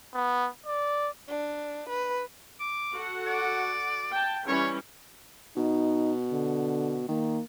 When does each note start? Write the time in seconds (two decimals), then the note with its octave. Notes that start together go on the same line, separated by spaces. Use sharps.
0.14 B3
0.66 D5
1.29 D4
1.89 B4
2.60 D6
2.95 F#4 A4 F#5
3.27 D5
4.11 G5 A5
4.47 E3 G3 C#4 C#5
5.57 B2 D#4
6.32 D3
7.08 D#3 A#3